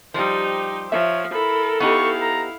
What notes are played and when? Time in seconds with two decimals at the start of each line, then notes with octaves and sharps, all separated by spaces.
0.14 F3 G3 D#4 G4 C5
0.92 F3 C#5 E5
1.33 E4 A4 A#4 B5
1.80 B3 D#4 E4 G4 F5 C#6
2.22 A#5